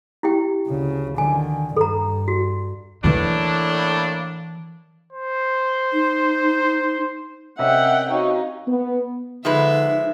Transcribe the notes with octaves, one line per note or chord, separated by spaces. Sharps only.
E4 G4 G5
D2 C#3
D3 D#3 G#5
G2 A4 A#5
F#4
A2 E3 A#3 D4 E4
C5
D#4
C3 C#4 A#4 D#5 E5 F#5 G5
D#4 F#4 C#5 D#5 F5
B3
D3 F3 G#3 D#4 B4 E5